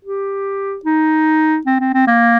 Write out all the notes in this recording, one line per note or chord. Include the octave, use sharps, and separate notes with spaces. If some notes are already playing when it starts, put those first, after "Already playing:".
G4
D#4
C4
C4
C4
A#3